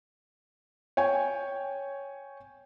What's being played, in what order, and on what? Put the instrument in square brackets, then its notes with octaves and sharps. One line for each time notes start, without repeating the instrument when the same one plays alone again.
[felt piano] C#5 G5 G#5